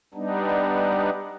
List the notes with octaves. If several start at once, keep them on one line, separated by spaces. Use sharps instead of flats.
G3 B3 D4 D#4